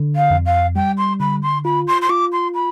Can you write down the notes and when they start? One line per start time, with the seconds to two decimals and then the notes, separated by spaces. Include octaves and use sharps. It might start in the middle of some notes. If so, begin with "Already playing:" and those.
Already playing: D3
0.16 F5
0.30 F2
0.46 F5
0.76 G3 G5
0.98 C6
1.20 D3 B5
1.42 C6
1.65 F4 B5
1.87 C6
2.02 C6
2.09 F4 D6
2.32 C6
2.54 B5